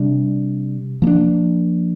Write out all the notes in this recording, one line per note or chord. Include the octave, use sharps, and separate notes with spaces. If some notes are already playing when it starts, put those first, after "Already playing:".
Already playing: C3 G3 D4
F3 A#3 D4